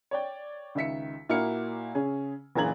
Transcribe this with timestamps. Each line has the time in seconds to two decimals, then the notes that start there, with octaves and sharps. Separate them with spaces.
0.11 C#5 D5 G5
0.75 C#2 D#3 E5 B6 C#7
1.29 A#2 A#3 E4 F#4 F6 C#7
1.95 C#3 C#4 G#4
2.55 F#1 A#2 E3 A#5 G#6 F#7